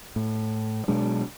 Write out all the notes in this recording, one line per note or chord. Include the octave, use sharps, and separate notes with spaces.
A2
B2 F#3 G#3 D4